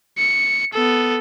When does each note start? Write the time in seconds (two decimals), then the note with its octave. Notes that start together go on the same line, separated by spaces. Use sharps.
0.18 C#7
0.74 B3 A4